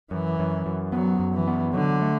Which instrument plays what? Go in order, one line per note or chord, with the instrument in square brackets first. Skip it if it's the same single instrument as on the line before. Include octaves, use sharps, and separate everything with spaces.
[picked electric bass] F#2 [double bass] E3
[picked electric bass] F#2
F#2
[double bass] F#3 [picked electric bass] B3
[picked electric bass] F#2
[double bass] E3
[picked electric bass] B3
[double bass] D3 [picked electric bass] F#3
[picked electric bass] A3